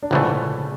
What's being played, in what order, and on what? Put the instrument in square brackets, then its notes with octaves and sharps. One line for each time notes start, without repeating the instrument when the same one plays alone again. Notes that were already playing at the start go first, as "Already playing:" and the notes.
[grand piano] D4
[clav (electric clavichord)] A#1 G#2 E3 A3 [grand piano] C#3 C#4